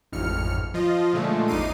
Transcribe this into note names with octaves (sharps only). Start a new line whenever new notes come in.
A1 F2 G#2 F6 C#7
F3 F4 D#5
A#2 D3 F3 G#3 A3
A1 E2 D#4 D6 C7 D#7